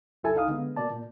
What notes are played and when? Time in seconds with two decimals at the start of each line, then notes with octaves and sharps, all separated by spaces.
0.23 C#2 F#2 E4 A4 G#5
0.35 C2 D#4 F5 D#6
0.48 D3 G#3 B3
0.77 B2 A#3 D5 A5
0.90 A#2